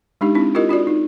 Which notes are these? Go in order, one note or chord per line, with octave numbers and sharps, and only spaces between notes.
G#3 D4 D#4 G4
C4 D4 E4
E4 F4 G4 A#4 D#5
D4 F4 F#4 D5
D#4